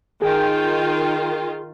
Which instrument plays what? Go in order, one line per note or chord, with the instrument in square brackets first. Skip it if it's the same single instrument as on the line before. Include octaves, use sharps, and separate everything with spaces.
[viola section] D#3 F4 [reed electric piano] G#4 [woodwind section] G5